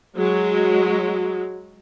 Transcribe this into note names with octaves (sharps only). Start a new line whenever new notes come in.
F#3 G#3